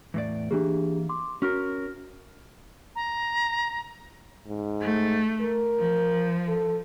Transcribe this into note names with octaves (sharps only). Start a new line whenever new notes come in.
E2 A2 D5
E3 A#3 D4 G4 G#4
C6 D6
C#4 F#4 A#4 F6
A#5
G#2
A3
A#4
F3
A4